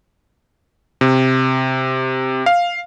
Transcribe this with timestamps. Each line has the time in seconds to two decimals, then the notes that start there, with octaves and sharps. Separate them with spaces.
1.01 C3
2.46 F5